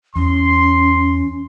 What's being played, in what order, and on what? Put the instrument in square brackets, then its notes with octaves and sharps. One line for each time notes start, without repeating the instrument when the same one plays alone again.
[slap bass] E2 [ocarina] C#4 [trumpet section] C6